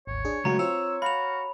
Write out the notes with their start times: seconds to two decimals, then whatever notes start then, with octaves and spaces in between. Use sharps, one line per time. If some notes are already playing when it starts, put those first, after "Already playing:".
0.07 G#1 D2 C#5
0.25 D4 G#4
0.45 C#3 F#3 G#3 A3 F#4 A#5
0.59 C4 F4 C5 C#5 E6
1.02 F#4 F5 B5 F7